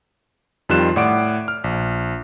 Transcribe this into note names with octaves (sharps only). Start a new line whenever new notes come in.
F2 D#3 G3 F4 F#6 E7
A2 D5 F#5 D6 D7
F6
A#1